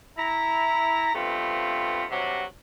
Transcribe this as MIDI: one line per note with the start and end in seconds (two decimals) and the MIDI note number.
0.18 1.12 64
0.18 1.12 82
1.14 2.05 43
1.14 2.05 57
1.14 2.05 59
1.14 2.05 60
1.14 2.05 65
2.11 2.44 43
2.11 2.44 48
2.11 2.44 54
2.11 2.44 66